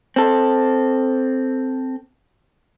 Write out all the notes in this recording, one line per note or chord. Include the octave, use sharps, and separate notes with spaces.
C4 A4